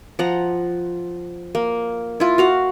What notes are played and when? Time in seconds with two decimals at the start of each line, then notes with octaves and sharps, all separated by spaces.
0.19 F3 F#5 A#5
1.55 A#3
2.20 E4 F4
2.38 F#4 F5 F#5